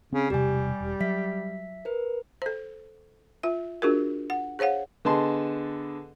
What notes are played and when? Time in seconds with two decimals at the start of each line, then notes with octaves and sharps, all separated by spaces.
0.13 C#3 C4
0.30 E1 C3 G3 G4 G#5
0.80 E1
1.00 F#3 E5 B6
1.85 A#4 B4
2.42 A4 C5
3.43 F4 E5
3.82 D4 F4 F#4 G#4 A#4
4.30 F#5
4.59 G#4 C5 C#5 F5 F#5
5.05 D3 B3 G#4 D#5 A5 C6